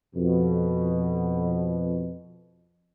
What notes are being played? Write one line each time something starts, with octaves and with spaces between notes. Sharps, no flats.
F2 B2